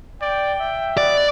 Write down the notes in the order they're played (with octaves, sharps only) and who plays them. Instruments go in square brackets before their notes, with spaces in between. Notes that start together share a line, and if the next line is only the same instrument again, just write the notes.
[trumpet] D5 [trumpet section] G5
[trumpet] E5
[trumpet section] B3 F#4 D#5 [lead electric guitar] D5